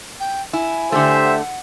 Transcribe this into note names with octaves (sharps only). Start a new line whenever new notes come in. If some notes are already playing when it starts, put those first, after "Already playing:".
G5
E4 G#5
D3 A3 G4 C5 E5
F#5